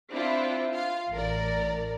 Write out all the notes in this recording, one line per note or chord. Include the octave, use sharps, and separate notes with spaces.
C4 D4 E4 F4
F4 F5
A1 A2 A#4 D5